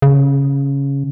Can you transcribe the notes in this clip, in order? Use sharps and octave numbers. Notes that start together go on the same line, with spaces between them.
C#3